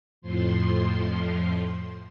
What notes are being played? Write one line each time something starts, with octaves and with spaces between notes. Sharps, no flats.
F2 A2 F3 C6